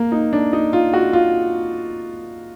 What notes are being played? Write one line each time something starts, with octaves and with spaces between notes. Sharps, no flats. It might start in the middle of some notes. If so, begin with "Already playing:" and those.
Already playing: A#3
D#4
D4
D#4
F4
F#4
F4